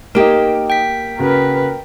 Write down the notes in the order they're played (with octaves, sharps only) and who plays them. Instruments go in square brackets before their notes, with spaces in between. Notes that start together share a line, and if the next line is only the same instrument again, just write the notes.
[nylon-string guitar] A#3 G4 [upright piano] D#4 D7 [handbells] A#4
[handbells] G5 B6
[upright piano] C#3 F#4 [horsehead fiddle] A#4 B4